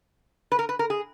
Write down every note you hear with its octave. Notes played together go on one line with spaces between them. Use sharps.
B4
A#4
B4
A#4
G#4